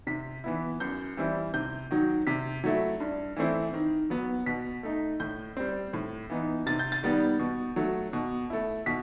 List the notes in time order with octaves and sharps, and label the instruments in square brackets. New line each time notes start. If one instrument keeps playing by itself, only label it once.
[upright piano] C3 B6
E3 B3 E4
F#2 G6
E3 G3 C4 E4
C3 G6
D#3 F#3
C3 B6
F#3 A3 E4
G2
E3 A3 C4 E4
D#3
F#3 B3
B2 B6
A3 D#4
A2 G6
G3 C4
A2
E3 B3 D#4
C3 A6
G6
A6
D#3 G3 B3
B2
F#3 A3
B2
A3 E4
B2 B6